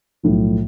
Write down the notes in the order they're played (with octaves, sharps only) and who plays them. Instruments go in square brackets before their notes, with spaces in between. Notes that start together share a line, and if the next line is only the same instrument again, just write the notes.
[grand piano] B1 A2 F3